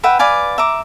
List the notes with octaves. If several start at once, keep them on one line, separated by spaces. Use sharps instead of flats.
B4 E5 F#5 G5
B4 D5 F5 G#5
E5 A#5 D6